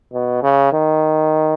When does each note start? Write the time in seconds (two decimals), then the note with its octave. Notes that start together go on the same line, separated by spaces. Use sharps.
0.13 B2
0.43 C#3
0.73 D#3